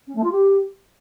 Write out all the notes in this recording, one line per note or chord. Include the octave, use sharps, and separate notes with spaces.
C#4
A3
F4
G4